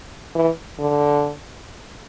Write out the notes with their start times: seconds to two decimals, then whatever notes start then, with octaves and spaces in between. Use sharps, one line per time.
0.35 E3
0.79 D3